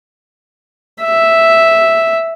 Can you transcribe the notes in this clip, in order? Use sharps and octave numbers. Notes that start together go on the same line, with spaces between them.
E5